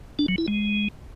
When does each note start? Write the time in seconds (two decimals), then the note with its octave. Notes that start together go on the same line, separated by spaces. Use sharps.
0.19 D4
0.28 F#3
0.38 E4
0.48 G#3